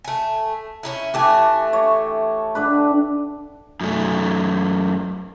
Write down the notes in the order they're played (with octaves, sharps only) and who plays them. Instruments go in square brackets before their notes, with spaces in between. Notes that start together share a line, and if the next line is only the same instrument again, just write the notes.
[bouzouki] A3 G#5
C#4 D#4 E4
[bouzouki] E3 A3 G#5 [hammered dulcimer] G4 A5
[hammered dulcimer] C#5
D3 D4 B4
[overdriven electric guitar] F#2 A3